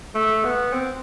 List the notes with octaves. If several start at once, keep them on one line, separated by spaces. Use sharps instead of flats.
A3
B3
C4